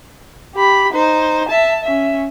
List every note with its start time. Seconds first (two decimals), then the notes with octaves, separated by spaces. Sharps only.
0.55 G4 B5
0.93 D#4 C5
1.49 E5 A5
1.84 C#4 E5